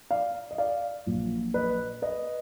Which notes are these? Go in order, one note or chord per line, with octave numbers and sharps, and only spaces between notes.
D5 F5
D#5
D5 F5
A#1 A#2 F#3
B4 D#5
B4 D#5